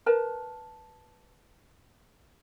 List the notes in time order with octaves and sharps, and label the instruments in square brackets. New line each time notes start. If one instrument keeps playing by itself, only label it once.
[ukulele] A#4 B4 A5